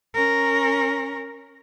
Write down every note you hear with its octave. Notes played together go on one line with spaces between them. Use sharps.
C#4 A#4